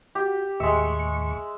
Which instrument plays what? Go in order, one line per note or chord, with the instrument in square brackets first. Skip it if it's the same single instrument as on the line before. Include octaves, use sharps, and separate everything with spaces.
[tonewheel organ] F#4 [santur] G4
[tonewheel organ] D#2 A2 C#6 [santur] G#3 E5